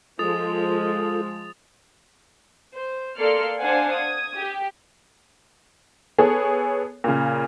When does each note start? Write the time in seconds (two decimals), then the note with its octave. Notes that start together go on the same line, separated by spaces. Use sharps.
0.19 F3 G#3 F4 A4 D#6 A6 F7
2.74 C5
3.18 A#3 A4 D5 C6 F6 C#7
3.59 D4 C5 F5 F#5 G#5
3.94 D#6 G#6
4.37 G4
6.18 B3 G#4 A4 C#5
7.04 A#2 C#3